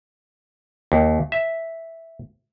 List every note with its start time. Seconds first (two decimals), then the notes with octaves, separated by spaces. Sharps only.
0.92 D#2
1.32 E5